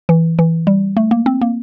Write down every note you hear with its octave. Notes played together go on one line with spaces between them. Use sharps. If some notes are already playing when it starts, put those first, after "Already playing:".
E3
E3
G3
A3
A#3
C4
A#3